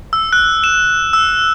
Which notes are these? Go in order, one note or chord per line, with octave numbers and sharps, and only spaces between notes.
E6
F#6
E7
E6